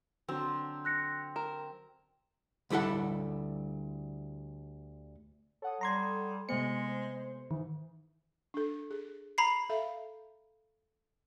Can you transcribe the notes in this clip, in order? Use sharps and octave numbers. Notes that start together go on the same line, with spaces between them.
D3 F#3 C4 A4
F#6 A#6 C#7
A#4 E7
D2 G3 E4 A4 F#5
A4 C#5 F#5 D#6
G3 A#5 C6 G#6
C3 G#3 A3 B3 C5 C#7
G#2 D#3 E3
D4 A4
G#4
A#5 B5 C7
A4 E5 F5